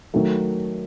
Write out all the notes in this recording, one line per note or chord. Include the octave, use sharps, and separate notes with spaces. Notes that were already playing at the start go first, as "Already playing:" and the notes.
D#3 F#3 A3